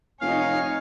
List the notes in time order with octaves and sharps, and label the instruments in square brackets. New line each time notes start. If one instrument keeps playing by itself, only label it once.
[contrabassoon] F1 [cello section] D#4 C#5 [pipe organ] F5 [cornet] G#5